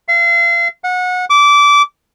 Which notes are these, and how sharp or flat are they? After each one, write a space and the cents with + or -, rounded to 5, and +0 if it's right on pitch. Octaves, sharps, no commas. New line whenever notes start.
F5 -35
F#5 -25
D6 -20